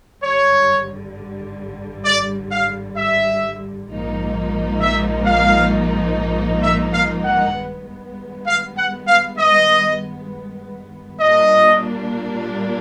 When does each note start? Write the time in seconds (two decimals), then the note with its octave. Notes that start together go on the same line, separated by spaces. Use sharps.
0.23 G#1 G2 D3 G3 C#5
2.05 D5
2.52 F5
2.97 E5
3.89 A#1 G#2 F3 A#3 D#4
4.81 E5
5.26 F5
6.63 E5
6.94 F5
7.24 F#5
7.55 G2 D#3 G#3 B3
8.47 F5
8.77 F#5
9.08 F5
9.38 D#5
11.20 A#2 G3 A#3 D4 D#5